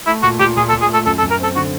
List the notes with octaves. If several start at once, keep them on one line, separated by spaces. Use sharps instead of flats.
A3 E4
A#2 F#4
A#2 G4
A#2 G#4
A4
A#2
G#4
A3 A4
F#2 A4
A4
F#2
A#4
C4 A4
D3 F#4